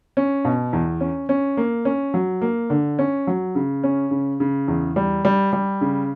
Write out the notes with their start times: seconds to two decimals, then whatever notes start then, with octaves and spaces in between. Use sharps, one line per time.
0.17 C#4
0.45 B2
0.73 E2
1.01 C#4
1.29 C#4
1.57 A#3
1.85 C#4
2.14 F#3
2.41 A#3
2.70 D3
2.99 C#4
3.27 F#3
3.55 C#3
3.83 C#4
4.11 C#3
4.40 C#3
4.68 E2
4.96 G3
5.25 G3
5.53 G3
5.81 C#3